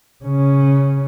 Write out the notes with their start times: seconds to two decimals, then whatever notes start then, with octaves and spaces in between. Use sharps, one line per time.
0.24 C#3 C#4